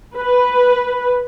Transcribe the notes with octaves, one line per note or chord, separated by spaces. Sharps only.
B4